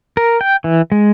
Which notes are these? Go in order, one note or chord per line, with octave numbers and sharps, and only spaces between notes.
A#4
G5
E3
G#3